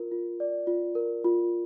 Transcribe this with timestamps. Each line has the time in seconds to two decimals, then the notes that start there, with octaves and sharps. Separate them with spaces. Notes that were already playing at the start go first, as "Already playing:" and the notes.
Already playing: F4 A#4
0.11 F4
0.40 D5
0.67 F4
0.95 A#4
1.24 F4